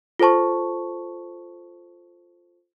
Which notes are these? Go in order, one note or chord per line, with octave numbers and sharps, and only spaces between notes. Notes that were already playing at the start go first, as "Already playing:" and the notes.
F4 A4 C5 A5 C#6